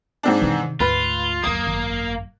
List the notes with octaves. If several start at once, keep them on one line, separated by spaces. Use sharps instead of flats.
G#2 C4 D4
C3 D#3 E3
D2 G#2 A3 F4 B4
F#1 F#2 A#3 D#6
G#1